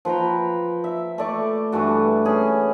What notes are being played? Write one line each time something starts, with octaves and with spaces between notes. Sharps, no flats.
F3 B4 G5 A#5
E5
A3 D5 C#6
G2 E3 A3 F#4
C#4 G#4